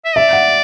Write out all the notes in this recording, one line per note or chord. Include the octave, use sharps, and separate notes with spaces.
E5
D5 E5
F#5